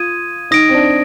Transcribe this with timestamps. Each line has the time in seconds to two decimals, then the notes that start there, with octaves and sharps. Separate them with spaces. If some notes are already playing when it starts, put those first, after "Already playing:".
Already playing: F4 D#6 G#6 D#7
0.51 D#4 D#6 A#6 D7
0.69 C4
0.74 D4